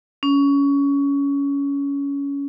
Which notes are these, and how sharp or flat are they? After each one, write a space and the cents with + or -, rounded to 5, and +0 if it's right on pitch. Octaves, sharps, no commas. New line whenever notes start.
C#4 +20